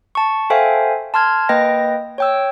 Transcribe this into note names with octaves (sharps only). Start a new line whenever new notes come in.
A5 C#6
A4 C5 E5 F5 G5 G#5
A5 C6 F6 G#6
A#3 B4 D#5 G5 A#6
C#5 G5 E6